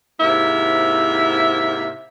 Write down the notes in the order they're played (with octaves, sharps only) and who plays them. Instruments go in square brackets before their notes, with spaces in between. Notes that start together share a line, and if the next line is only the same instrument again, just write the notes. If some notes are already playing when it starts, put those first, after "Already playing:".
[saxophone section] G#2 C3 A#3 E4 E5